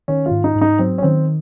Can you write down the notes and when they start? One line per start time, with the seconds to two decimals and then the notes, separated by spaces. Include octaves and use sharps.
0.08 D#3 C#4
0.26 F4
0.31 G#2
0.44 D#4
0.55 G#2
0.61 D#4
0.79 F#3 C4
0.98 C#4
1.02 D#3 C4